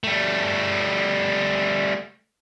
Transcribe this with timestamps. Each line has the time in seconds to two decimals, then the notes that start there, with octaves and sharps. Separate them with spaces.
0.04 G3 A3